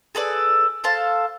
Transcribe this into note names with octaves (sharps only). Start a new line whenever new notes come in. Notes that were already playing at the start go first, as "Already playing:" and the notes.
G#4 A4 B4 D5
A4 C5 F5 A5